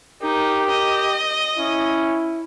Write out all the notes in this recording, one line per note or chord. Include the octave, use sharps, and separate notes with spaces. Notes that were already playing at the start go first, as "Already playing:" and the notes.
D#4 G4 A#4
D#5
C#4 E4